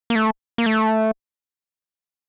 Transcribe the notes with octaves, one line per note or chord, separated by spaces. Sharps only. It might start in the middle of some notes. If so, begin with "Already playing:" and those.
A#3
A3
A#3
A3